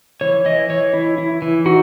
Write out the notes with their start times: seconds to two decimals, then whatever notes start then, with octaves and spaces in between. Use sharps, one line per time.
0.21 E3 C#5
0.45 E3 D#5
0.70 E3 C#5
0.94 E4
1.18 E4
1.42 E3
1.66 D#4 F#4